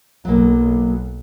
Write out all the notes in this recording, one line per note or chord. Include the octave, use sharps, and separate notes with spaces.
B1 F#3 A#3